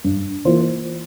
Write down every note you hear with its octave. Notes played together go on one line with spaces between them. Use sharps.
G2
E3 A#3 F4 C5